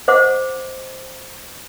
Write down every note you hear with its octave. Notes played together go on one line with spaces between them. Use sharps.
C5 D#5 F#5 D6